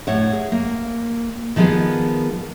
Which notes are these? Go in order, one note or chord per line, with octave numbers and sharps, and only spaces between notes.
A2 C#5 F#5
G#4
A#3
D#3 F3 G#3 B3 G#4